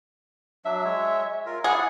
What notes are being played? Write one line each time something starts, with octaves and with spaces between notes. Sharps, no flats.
F#3 D4 E5
G#3 C#5
F4 A#4
E4 G#4 D5 F#5